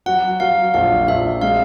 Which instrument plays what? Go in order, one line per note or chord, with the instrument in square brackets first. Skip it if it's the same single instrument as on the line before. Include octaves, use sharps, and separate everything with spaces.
[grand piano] F#3 [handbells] F#5
[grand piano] F#3 [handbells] F5
[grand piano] A#1 [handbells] F5
[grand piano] A#1 [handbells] E5
[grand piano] G#3 [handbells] F5